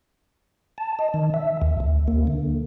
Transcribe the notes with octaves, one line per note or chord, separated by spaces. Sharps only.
A5
D#5
D#3
E5
D#2
D2
A#3
D3